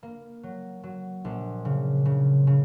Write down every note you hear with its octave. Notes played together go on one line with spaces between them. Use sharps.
A#3
F#3
F#3
A#1
C#3
C#3
C#3